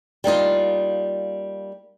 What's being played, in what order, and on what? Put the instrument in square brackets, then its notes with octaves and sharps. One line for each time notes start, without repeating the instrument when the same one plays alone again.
[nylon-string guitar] G3 A#3 D#4 F4